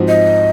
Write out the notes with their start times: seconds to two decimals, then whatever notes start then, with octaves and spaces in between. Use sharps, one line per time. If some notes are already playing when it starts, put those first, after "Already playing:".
Already playing: G#2 F3 C4 F#4
0.08 D#5